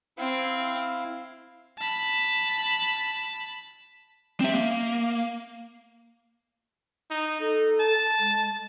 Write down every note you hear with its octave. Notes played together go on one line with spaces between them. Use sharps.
C4 E4 F5
A5 B5
C4 E5
A#3
D#4
D#4 A4
A5
G#3